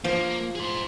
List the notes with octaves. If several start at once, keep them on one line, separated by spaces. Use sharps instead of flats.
F3 A#3
G#4 C5